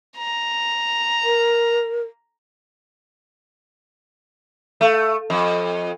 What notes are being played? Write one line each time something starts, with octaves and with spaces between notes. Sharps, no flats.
A#5
A#4
A3
F2